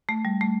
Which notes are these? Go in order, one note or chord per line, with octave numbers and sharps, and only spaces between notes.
A3
G3
A3